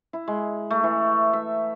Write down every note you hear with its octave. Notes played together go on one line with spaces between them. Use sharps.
E4
G#3
A3
E3
E5